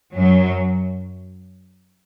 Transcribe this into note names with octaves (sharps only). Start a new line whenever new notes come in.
F#2 F#3